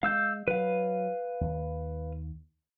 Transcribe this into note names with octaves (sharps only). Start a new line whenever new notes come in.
G#3 F5 E6 G6
F#3 B4 F5
D#2